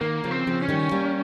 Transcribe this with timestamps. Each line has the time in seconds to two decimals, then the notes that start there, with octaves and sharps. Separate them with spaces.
0.01 D#3 A#3
0.24 C#3 F3
0.31 C4
0.47 C#3 F3
0.62 C#4
0.69 D#3 G3
0.91 G3 A#3